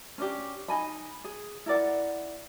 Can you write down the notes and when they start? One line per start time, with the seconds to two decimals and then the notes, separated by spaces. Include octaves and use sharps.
0.18 C#4 D4 G4
0.68 D#4 D#5 G#5 B5
1.24 G#4
1.66 E4 A#4 D5 F#5